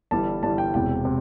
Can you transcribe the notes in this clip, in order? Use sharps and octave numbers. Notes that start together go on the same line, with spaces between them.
G1 G2 E3 G3 A5
G1 G2 E3 G3 A5
G5
E1 E2 C3 G5
C3